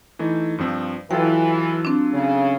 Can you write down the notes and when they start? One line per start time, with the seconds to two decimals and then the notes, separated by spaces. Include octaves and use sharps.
0.19 E3 A3 D#4
0.58 G2 F3 C4
1.11 E3 F#3 F4 A4 G5
1.85 C4 D4
2.13 C#3